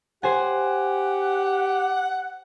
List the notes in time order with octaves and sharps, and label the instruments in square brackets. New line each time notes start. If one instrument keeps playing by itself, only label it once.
[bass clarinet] G4 [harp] C5 G#5 [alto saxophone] F#5